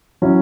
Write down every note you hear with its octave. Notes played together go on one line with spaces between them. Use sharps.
F#3 C#4 E4